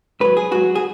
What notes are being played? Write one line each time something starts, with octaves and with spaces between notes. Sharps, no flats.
G#2 F#3 B4
G#4
G#2 F#3 F#4
G#4